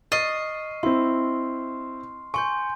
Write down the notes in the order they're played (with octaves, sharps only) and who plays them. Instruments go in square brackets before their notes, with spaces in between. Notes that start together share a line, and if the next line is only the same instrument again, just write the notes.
[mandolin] D#5 [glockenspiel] C#6 F6 C7 [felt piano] A6
[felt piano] C4 E4 [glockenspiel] C6
[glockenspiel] G#5 C6 G6 [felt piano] C#6